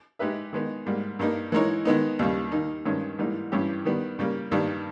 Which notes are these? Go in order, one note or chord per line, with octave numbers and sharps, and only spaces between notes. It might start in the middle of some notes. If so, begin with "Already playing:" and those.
G#3 D#4 G4 B4 E5
D#3 G#3 B3 D#4
G#2 G3 A#3
G2 G3 A#3 D#4
E3 G#3 D#4 A#4 C#5
D#3 G#3 B3 D#4
D#2 C#3 G3
D#3 A#3 D#4
G2 D#3 G#3 C#4
G#2 E3 G3 A#3 D#4
G2 E3 G3 C#4 G4
D#3 G3 B3
C#3 G3 A#3
G2 D#3 G3 A#3